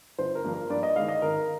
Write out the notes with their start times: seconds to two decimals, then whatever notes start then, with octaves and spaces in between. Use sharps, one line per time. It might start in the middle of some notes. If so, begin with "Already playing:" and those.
0.18 G1 C5
0.35 A#4
0.44 G2 F3 A#3
0.53 A#4
0.70 G2 D5
0.83 D#5
0.96 D#3 G#3 F5
1.08 D#5
1.22 G#1 A#4